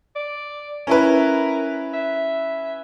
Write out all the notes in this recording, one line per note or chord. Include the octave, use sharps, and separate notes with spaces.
D5
C#4 E4 A#4 B4
E5